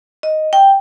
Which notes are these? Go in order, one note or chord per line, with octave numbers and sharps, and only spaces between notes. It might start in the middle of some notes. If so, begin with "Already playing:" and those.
D#5
G5